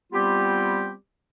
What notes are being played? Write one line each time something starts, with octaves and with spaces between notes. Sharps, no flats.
G3 B3 C4 F4 G4